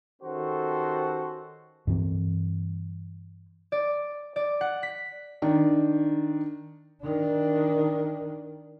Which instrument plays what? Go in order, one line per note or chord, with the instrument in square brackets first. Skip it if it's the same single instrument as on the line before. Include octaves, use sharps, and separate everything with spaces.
[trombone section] D#3 C#4 F#4 G4 A4 C5
[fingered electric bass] G2 E3 C4
[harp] D5
D5
F#5
B6
[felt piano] D#3 D4
[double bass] D#3 D4